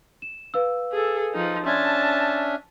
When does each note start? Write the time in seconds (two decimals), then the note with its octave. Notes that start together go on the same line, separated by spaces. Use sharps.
0.22 E7
0.54 B4 F5 E6
0.93 G#4 A4
1.34 F3 D#4
1.66 C#4 D4 E5 A5 C6 G#6